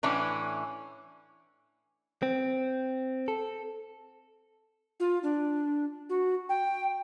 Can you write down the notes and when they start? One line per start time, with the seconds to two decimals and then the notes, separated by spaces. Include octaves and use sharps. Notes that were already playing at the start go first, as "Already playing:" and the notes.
0.03 A2 E3 C#4 D4
2.23 C4
3.28 A4
5.00 F4
5.23 D4
6.09 F#4
6.49 G5